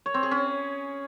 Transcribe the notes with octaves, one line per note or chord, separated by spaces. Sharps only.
C#5
C4
G#4
C#4